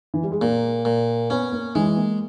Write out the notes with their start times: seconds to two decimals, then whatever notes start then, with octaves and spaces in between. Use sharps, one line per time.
0.14 E3
0.23 G3
0.31 G#3
0.41 A#2 A#3
0.85 A#2
1.30 B3 C#4
1.52 A#3
1.75 E3 G#3
1.97 A#3